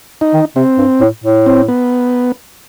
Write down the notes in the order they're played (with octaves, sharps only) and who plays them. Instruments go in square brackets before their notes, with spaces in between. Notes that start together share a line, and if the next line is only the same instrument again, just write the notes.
[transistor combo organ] D#4
[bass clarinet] D#3
[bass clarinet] C3 [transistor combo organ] C4
[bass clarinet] G2
A2
A2
[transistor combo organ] C4
B3